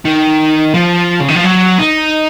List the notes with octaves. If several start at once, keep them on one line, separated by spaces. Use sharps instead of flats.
D#3
F3
C#3
D#3
F3
F#3
D#4